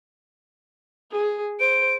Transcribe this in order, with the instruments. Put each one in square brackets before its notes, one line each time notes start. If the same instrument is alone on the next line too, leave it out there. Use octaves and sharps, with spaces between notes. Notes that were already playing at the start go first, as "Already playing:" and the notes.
[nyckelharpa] G#4
[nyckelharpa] C5 [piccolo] D7